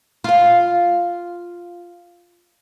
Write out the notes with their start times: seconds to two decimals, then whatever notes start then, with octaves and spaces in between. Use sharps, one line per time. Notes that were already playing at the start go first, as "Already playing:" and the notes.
0.24 F4 F5